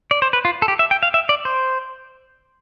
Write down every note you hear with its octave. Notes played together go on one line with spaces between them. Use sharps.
D5
C5
B4
F4
A4
G4
E5
G5
F5
E5
D5
C5